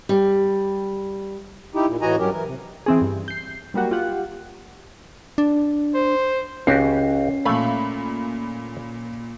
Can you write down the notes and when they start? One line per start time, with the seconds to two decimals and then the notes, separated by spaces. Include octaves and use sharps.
0.09 G3
1.75 D#4 E4 G4
1.87 A#2
2.02 A2 E3 F#4 D#5 G#5 A#5
2.19 G2 F#3 C#4 G4 A#4
2.32 E3 A#4
2.45 C3
2.86 E3 C4 G#4
3.01 G2
3.28 G6 C7
3.74 F#3 G3 A#3 F#4 G4
3.91 F4 G4 F#5
5.38 D4
5.95 C5
6.67 C#2 C#4 F#4 G4 C7
7.45 A#2 A3 F5 G#5 B5